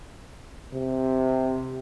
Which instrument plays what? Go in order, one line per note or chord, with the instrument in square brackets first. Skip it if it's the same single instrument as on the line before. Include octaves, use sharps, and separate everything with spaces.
[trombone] C3